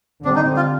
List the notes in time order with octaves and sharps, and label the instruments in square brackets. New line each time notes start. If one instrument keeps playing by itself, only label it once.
[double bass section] D3 G3 C4 [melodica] D4
[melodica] D#4
F4